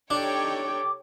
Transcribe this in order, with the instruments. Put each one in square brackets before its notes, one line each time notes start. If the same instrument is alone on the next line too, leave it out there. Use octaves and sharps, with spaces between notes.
[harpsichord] D4 [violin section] D#4 C#5 G5 [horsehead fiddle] G4 A4 [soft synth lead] D6